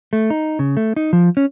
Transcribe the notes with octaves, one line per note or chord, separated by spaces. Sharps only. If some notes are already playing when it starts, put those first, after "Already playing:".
A3
D#4
C#3
A3
D#4
F3
C#4